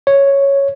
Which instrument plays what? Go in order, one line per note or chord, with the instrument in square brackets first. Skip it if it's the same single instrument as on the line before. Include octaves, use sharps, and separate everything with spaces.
[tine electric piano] C#5